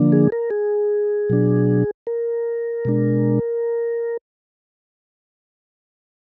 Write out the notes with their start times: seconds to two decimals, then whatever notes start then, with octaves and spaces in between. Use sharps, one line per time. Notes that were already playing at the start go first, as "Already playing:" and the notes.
Already playing: D3 F3 A#3 D4
0.12 G#4
0.32 A#4
0.51 G#4
1.30 B2 F#3 D4
2.07 A#4
2.85 B2 G#3 D4